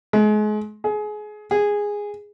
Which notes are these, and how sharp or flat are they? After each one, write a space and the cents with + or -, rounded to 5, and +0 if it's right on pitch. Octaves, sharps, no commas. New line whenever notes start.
G#3 +35
G#4 +25
G#4 -10